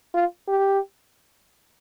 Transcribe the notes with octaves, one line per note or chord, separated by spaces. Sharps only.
F4
G4